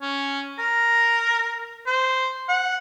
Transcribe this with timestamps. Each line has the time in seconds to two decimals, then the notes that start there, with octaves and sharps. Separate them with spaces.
0.01 C#4
0.58 A#4
1.87 C5
2.49 F#5